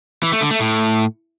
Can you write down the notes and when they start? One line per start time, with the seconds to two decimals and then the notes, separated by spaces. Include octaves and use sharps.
0.23 E3
0.32 A3
0.41 D3
0.51 A3
0.60 A2